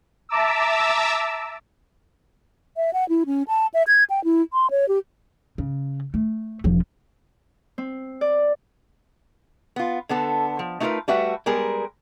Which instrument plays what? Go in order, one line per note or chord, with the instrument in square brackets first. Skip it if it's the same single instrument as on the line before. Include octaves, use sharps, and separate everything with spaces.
[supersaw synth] E5 A5 A#5 D6 E6
[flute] E5
F#5
E4
C#4
A5
E5
G#6
G5
E4
C6
C#5
G4
[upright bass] C#3
A3
E1 F3
[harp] C4
D5
[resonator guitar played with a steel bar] B3 F4
D3 B3 A4
F3
A3 D#4 F4 G#4 A#4 B4
G3 A3 F#4 B4 E5
G3 G#3 B3 G#4 A#4